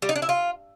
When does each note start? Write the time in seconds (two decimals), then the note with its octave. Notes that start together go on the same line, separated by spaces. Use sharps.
0.02 G3
0.09 D#4
0.16 D4
0.22 E4
0.29 F4